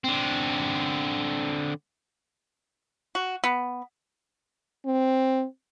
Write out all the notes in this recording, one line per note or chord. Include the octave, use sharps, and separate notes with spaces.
D3 C4
F#4
B3
C4